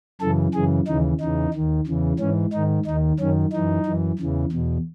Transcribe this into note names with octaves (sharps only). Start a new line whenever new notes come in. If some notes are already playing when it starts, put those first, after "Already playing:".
F#2 C#3 E3 A4
F#2 C#3 E3 G#4
D#2 C#3 E3 D#4
E2 C#3 E3 D#4
D#2 D#3
E2 C#3 E3
G#2 E3 C#4
G#2 D#3 D#4
D#2 D#3 D#4
F#2 D#3 C#4
F#2 E3 D#4
F#2 E3
E2 C#3 E3
E2 B2